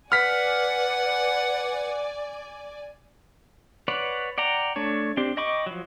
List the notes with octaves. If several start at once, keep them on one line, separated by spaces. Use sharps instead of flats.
B4 D5 F#5 G#5 F6 B6
B4 C#5 D5 F#5
D5 F#5 G5 A#5
A3 D4 C#5
C4 D4 G4
D#5 G5 B5 C#6 D6
F3 F#3